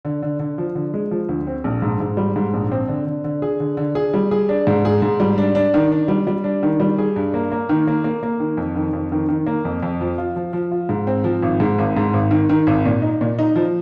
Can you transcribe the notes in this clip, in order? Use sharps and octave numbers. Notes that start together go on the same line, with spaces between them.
D3
D3
D3
F3
D3
G#3
F3
D2
C4
A#1
G#2
G#2
G3
G#2
A#1
C4
D3
D3
D3
G#4
D3
D3
G#4
G3
G#4
D4
G#2
G#4
G#2
G3
D4
D4
D#3
D4
G3
G3
D4
D#3
G3
G#4
G2
A#3
A#3
D#3
A#3
A#3
A#3
D#3
F2
D#3
F2
D#3
D#3
A#3
F2
F2
F3
F4
F3
F3
F4
G#2
C4
F3
G#1
G#2
G#1
G#2
G#1
D#3
D#3
G#1
A#2
D#4
A#2
D#4
F3